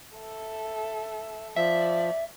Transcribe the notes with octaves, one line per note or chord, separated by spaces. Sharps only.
A4 E5
F3 D5 E5